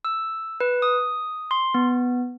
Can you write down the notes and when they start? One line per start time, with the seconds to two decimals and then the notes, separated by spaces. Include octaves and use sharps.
0.05 E6
0.60 B4
0.82 D#6
1.51 C6
1.74 B3